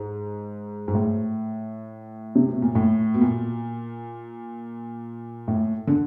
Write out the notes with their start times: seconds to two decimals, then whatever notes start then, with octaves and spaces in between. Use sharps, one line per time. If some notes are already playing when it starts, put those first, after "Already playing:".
Already playing: G#2
0.88 G#2
0.95 A2
2.35 C3
2.48 B2
2.62 A#2
2.75 A2
3.14 B2
3.21 A#2
5.48 A2
5.87 D3